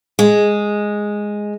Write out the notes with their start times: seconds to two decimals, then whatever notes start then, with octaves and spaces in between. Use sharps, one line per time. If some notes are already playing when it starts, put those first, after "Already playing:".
0.19 G#3